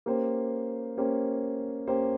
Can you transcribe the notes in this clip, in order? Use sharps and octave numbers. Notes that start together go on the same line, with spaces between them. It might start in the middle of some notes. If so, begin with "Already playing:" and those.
A#3 C#4 G4 C5
A#3 C#4 G4 C5
A#3 C#4 G4 C5